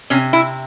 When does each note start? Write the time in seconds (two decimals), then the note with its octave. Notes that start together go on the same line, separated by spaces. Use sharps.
0.10 C3 C#4
0.33 E4